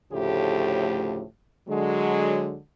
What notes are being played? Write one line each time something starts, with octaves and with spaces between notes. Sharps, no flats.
D2 A2 C#3 F3 A3 G4
D3 F#3 G#3